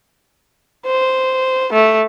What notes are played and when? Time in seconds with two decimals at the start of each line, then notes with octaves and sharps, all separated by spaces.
0.86 C5
1.73 A3